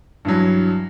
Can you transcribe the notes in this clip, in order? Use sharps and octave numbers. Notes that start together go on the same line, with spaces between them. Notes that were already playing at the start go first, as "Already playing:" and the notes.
G2 E3 F#3